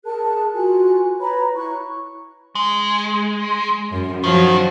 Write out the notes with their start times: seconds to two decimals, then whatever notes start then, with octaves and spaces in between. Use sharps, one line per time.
0.05 G#4 A#4 A5 F#6
0.54 F4 F#4 G#5 F#6
1.20 B4 C#5 A#5 B5
1.56 E4 C#6 F#6
2.55 G#3
3.92 F#2
4.24 D#3 F3 F#3